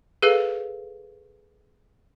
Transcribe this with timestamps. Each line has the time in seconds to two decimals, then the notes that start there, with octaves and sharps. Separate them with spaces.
0.22 G#4 A4 B4 F5